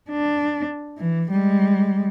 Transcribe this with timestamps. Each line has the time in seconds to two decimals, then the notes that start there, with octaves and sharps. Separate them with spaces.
0.11 D4
0.98 E3
1.31 G3 G#3